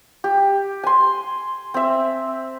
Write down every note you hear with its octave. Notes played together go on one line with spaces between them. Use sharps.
G4
G#5 C6
C4 E5